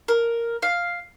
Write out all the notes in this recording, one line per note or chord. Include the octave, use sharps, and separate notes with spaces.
A#4
F5